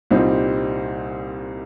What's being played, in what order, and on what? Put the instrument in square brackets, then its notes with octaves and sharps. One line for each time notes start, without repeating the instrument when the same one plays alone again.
[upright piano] C2 A#2 G3 C4 D#4